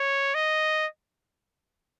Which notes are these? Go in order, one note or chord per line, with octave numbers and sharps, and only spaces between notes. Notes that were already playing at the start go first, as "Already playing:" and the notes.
Already playing: C#5
D#5